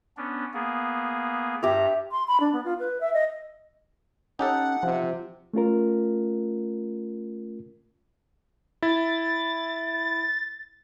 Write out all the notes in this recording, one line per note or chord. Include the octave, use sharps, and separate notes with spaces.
B3 C#4 D4
A#3 B3 G#4
G2 G4 E5 A#5
C6
B5
D4
B3
F4
B4
E5
D#5
C#4 D#4 G4 A4 F#5
C3 F3
A3 C#4 F4 A#4
E4 A6